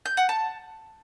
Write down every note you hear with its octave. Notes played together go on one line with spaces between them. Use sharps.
G6
F#5
A5